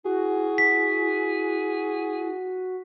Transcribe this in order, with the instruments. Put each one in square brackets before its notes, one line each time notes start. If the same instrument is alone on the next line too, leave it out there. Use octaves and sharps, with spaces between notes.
[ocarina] E4 [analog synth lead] F#4 [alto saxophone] G#4
[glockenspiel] B6